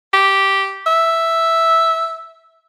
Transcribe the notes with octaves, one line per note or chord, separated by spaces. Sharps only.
G4
E5